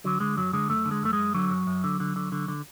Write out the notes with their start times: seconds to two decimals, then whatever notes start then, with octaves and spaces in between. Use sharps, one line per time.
0.04 D3 F#3
0.20 D3 G#3
0.37 F#2 F#3
0.53 D3 G#3
0.69 F#2 A3
0.85 D3
0.91 G#3
1.03 F#2 A3
1.13 G#3
1.18 F#2
1.34 D3 F#3
1.50 F#2
1.67 F#2
1.84 D3
2.00 D3
2.16 D3
2.32 D3
2.48 D3